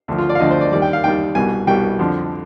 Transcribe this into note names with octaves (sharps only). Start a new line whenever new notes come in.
D2 D3 F3
F4
D5
F5
D2 D3 F3 D#5
C5
D5
D#2 D#3 G3 D5
G5
F5
D#2 D#3 G3 G5
C2 B2 G3 G#5
C2 B2 G3 G5
F2 D3 F3